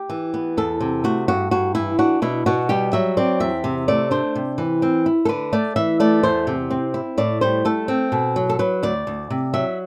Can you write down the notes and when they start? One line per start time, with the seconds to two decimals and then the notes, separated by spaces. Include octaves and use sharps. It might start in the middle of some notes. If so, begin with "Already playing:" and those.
Already playing: G4
0.10 E3
0.34 B3
0.57 E2 A4
0.80 C3
1.04 A3 F#4
1.28 G2 F#4
1.51 G2 F#4
1.75 E3 E4
1.99 D4 F#4
2.22 B2 E4
2.46 B2 F#4
2.69 G3 G4
2.93 F#3 E5
3.17 C4 D5
3.40 E2 E5
3.64 C3
3.88 A3 D5
4.11 D4 C5
4.35 C3
4.58 E3
4.82 C4
5.06 E4
5.25 A4
5.29 D3 B4
5.53 A3 D5
5.76 E3 E5
6.00 A3 D5
6.23 E2 C5
6.47 C3
6.71 C4
6.94 E4
7.18 A2 D5
7.41 G3 C5
7.65 A3 A4
7.88 C4
8.12 B2
8.36 F#3
8.49 A4
8.59 F#3 B4
8.83 D2 D5
9.07 D2
9.30 C3
9.54 F#3 E5